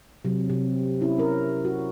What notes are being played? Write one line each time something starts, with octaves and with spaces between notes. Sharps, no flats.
C3 F#3
C3
C#4 E4
C#4 A#4
F#4